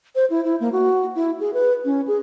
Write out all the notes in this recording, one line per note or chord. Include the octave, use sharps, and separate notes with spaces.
C5
E4
E4
A#3
F#4
E4
G#4
B4
C#4
G#4